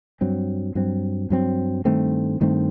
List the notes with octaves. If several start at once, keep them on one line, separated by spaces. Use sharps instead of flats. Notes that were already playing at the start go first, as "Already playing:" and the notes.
G2 F#3 C4
G2 F#3 C4
G2 F#3 C4
G2 D#3 A3 C4
G2 D#3 A3 C4